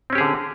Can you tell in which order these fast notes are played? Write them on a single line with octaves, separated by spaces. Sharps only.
C4 C#4 G4 G#4 D3